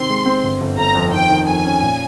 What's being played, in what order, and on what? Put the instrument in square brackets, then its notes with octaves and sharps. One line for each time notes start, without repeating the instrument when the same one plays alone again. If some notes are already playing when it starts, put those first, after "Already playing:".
Already playing: [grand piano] C3 D#3 C4 [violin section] C6
[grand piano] G#3
C4
G1
G1
[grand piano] G1 [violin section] A#5
[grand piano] F2
[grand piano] D#3 [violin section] G5
[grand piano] D#3
[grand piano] F2 [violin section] G#5
[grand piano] C#4
A#2